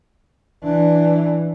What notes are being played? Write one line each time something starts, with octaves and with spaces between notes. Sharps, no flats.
E3 D4